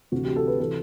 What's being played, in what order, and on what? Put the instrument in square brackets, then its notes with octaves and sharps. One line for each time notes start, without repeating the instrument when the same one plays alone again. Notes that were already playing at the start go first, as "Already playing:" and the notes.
[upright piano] D2 C3 E3 F#4
G4
A4
B4
C3 E3 A4